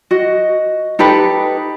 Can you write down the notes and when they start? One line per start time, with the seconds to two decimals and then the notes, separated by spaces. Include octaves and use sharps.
0.11 F#4 D#5
0.99 D#4 G4 A4 B4